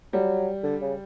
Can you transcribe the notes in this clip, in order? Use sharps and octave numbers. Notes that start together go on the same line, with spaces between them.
F#3 G3
D3
C#3